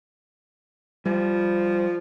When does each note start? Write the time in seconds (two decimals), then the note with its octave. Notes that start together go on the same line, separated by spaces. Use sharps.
1.06 F3 G3